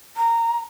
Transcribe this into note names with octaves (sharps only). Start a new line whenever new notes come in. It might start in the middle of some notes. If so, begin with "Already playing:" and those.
A#5